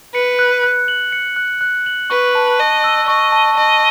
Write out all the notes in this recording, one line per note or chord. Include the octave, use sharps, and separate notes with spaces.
B4 C#7
F#6
F#6
F#7
C#7
F#6
F#6
F#7
B4 C#6
A5
D#5 A5
E6
D#5 C#6
A5
D#5 A5